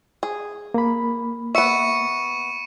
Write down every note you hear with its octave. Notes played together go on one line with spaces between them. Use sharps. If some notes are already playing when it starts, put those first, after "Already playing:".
G#4
A#3 B5
B3 E5 C#6 C#7 D#7